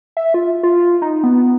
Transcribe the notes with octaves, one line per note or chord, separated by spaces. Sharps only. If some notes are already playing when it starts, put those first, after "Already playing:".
E5
F4
F4
D#4
B3